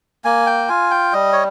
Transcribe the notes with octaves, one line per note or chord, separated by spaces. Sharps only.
A#3 G#5
G5
F4 G#5
G5
G3 D#5
C#5